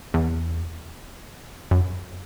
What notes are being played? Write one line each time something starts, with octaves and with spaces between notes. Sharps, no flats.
E2
F#2